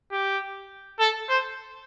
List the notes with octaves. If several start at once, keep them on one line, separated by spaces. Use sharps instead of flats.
G4
A4
C5